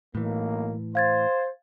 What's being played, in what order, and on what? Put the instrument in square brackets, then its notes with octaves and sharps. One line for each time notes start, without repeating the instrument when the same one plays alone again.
[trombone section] B1 A#3 [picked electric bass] A2 E3
[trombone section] C5 [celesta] F5 G#6 A6